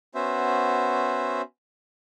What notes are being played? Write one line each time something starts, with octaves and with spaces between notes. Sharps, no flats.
B3 C#4 F#4 C5 E5